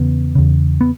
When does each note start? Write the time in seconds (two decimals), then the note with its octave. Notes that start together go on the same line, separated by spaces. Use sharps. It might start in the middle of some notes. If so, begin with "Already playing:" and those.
Already playing: E2 C#3 B3
0.35 E2 C#3
0.81 B3